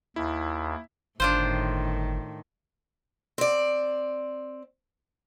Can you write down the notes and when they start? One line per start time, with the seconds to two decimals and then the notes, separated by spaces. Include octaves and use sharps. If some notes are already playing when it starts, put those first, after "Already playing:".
0.16 D#2 E4
1.20 G1 A2 D#3 D4 F4 C5
3.38 C4 D5